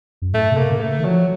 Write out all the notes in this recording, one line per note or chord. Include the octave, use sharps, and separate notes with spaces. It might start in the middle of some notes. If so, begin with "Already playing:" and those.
F#2
A2 A3
C3
A#3
C#3
A3
D#3
F3 F#3